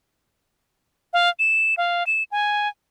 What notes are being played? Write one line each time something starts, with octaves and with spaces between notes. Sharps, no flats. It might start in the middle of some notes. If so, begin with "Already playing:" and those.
F5
E7
F5
E7
G#5